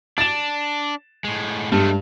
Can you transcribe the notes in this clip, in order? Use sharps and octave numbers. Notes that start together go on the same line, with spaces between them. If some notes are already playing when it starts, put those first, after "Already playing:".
D4 A6 E7
A2 G#3
G2 G#3 A3